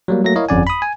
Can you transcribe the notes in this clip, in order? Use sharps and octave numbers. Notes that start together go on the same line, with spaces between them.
F#3 G3 A#3
F#3 A3 A#3 A#6
E4 A#4 C#5 D#5 F5
G1 F2 C#4 D5 F#5 G#5
B5 D#6
G#5